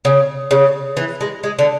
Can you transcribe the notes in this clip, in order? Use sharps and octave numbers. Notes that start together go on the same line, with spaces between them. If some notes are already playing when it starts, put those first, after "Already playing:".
C#3
C#3
E3
G#3
G#3
D3